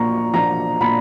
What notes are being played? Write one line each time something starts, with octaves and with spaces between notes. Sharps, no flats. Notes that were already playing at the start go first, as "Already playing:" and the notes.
Already playing: A#2 F3 A#3 D4 A#5 C#6
F3 A#3 D4 A#5
A#2 B5